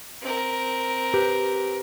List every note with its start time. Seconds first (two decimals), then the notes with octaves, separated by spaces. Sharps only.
0.22 C4 A#4
1.14 G4 B4 C5